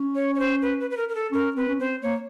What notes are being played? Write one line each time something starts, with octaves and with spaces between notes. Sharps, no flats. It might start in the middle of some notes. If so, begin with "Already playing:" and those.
Already playing: C#4
C#5
C#5
C5
B4
B4
B4
A#4
A#4
A4
C#4 A#4
C4 B4
C#4
C4 C5
A#3 C#5